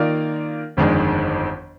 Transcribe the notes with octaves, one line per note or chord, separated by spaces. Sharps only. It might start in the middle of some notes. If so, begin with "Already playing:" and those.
Already playing: D#3 A#3 F4 A#4 D5
G1 F2 D#3 G#3 D4